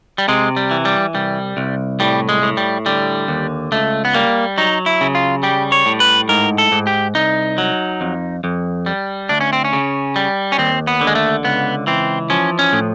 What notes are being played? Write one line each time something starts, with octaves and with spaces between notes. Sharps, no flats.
G3
C3 G#3
G3
E3
G3
C2 G3
C2
A2 G3
G#3
A2
G3
D3 G3
D#2
C#2 A3
B3
G3 A#3
F#3 D#4
E4
C#3
F4
G3 G4
C#5
A2
B4
G#2 A#4
A4
G#2
G4
C2 D#4
F#3
F2
F2
G3
D2 D4
C#4
C4
C#4
C#3
G3
C#4
D#2 C4
B3
D3
G#3
A3
C#2 B3
E3 C4
F3 C#4
C#4
A2